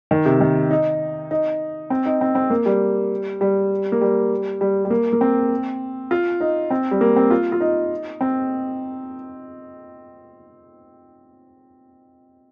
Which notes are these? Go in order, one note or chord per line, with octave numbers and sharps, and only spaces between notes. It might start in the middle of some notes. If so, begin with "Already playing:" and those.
D#3
C3
D#3
D#4
D#4
C4
D#4
C4
C4
A#3
G3
G3
A#3
G3
G3
G3
A#3
A#3
C4
F4
D#4
C4
G3
A#3
C4
F4
F4
D#4
C4